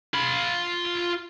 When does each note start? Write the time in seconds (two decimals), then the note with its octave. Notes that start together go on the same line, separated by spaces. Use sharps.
0.14 F4 B5